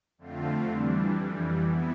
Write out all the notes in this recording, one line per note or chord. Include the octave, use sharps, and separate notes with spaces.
F2 D3 A3 C4 F4
E3 G3 D4
F2 E3 G3
E3 B3 E4